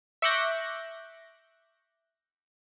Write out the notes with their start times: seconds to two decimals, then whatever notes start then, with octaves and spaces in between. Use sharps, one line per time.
0.22 E5 C#6 D6 F#6 G6 A#6